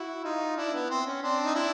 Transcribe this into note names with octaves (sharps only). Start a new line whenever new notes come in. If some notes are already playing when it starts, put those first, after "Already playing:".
Already playing: E4 F#4
D#4 F4
D4 E4
B3
C4
C#4
C4 D4
D#4
D4 E4